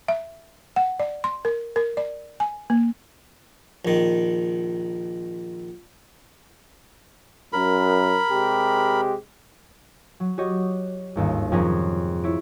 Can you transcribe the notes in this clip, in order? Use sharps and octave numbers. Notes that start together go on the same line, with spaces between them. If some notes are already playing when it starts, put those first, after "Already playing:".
E5
F#5
D5
C6
A#4
A#4
D5
G#5
A#3
A#1 D#3
F#2 A#4 B5
C3 G#3 G4
F#3
F#4 G4 C#5 D#5
G1 D#2 G#2
F2 C3 C#4 G#4 A#4
E4 C#5 D7